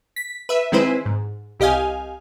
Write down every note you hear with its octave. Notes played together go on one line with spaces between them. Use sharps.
B6
B4 E5
D#3 G#3 C4 E4 B4 C5
G#2
C2 G4 D#5 F5 G#5